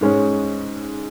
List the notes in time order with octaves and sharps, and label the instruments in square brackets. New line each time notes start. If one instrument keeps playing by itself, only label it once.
[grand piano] G#2 G#3 C#4